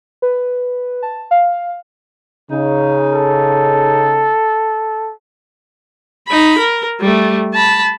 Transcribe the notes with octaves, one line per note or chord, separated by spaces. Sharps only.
B4
A5
F5
C#3 D#4
A4
D#4 B5
A#4
G3 A3
A5 B5